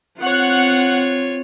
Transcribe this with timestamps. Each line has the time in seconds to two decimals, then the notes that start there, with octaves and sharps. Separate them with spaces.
0.20 C4 F4 C#5 F#5